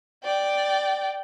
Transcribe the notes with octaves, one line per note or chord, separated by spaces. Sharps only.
D5 G5